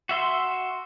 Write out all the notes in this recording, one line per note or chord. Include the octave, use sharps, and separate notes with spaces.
F#4 E5 C6